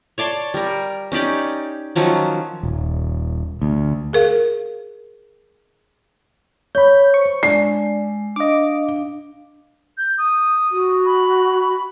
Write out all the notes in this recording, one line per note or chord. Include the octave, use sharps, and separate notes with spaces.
C#5 D5 A5 C6
G3 A#4
C#4 D#4 G4 D5
D#3 F3 F#3 C#4
D#1
D2
G#4 A#4 F5
C#5 B5 G6
C5 C#6
G#3 D4 C7
D4 D#5 F5 D6
G6
D#6
F#4
B5